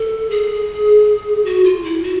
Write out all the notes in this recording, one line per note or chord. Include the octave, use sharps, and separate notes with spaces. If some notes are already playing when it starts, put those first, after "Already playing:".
Already playing: A4
G#4
F#4
F4
E4
F#4